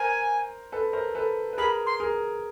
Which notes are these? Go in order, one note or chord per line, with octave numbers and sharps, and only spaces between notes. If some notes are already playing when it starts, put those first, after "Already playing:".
Already playing: A#4 C5 G#5
A4 B4
A#4 C5
A4 B4
B4
G#4 A#4 B5
C6
G#4 A#4